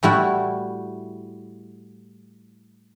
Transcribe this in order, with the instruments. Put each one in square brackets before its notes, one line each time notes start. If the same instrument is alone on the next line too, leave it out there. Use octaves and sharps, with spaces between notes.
[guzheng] A2 G3 E4 F#4